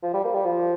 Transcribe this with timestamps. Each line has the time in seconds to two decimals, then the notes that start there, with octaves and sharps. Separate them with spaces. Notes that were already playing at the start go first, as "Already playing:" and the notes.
0.02 F3
0.13 G3
0.24 A#3
0.34 G3
0.45 F3